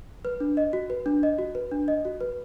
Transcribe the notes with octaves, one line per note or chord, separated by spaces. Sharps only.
B4
D4
D#5
F#4
B4
D4
D#5
F#4
B4
D4
D#5
F#4
B4